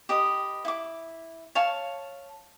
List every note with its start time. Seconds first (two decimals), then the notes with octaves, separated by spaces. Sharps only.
0.09 G4 B4 D#5
0.65 E4 D6
1.55 C#5 F5 A5